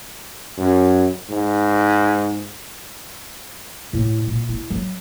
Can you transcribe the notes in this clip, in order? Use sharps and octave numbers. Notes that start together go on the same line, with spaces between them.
F#2
G#2
A2
A#2
E4
F#3